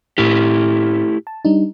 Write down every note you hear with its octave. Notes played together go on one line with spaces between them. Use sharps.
A2 A3 E4 G4 F6
A5
G3 D4 D#4